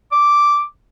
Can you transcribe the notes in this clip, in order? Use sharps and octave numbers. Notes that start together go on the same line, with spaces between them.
D6